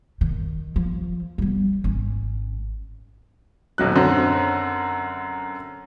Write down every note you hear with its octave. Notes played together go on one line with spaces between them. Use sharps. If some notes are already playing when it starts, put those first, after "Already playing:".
D#3
F3
G3 B3
G#1 C#4
D#1 B1 F#3 F#6
F#2 D3 C4